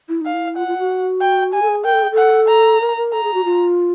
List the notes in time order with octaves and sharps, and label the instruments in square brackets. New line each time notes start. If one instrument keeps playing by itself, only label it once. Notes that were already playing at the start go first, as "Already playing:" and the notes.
[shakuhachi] E4
[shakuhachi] D#4 [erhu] F5
[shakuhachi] E4
[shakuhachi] F4 [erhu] F#5
[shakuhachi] F4
F#4
[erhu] G5
[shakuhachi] G4 [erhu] G#5
[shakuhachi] A4
G#4
[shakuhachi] A#4 [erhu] G5
[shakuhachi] A4
G#4
A4
[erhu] F#5
A#5
[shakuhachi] A#4
A#4
[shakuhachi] A4 [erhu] A#5
[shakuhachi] G#4
F#4
F4